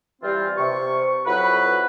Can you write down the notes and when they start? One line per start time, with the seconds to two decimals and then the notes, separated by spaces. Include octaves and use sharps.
0.22 E3 G3 C4 F4
0.58 C3 C#6
1.26 F2 F#3 E4 F#4 B4